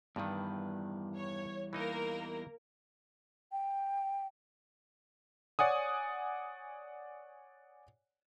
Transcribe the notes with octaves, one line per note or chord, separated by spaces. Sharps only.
E2 G2 D#3 G3 B4
C#5
E3 A#3 D#4 A#4 D#5
G5
C#5 D5 F#5 G#5 D#6